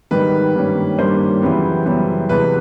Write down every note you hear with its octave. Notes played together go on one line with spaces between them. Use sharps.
G#2 D#3 G3 B4
G2 D#3 G3 A#3 C#4
G2 D#3 G3 A#3 C#4 C5
F#2 C#3 E3 G3 B3
F#2 C#3 E3 G3 B3
E2 C3 E3 G#3 B4